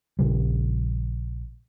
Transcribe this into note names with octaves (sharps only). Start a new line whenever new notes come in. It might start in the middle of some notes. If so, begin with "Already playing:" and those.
A#1 C#3 G3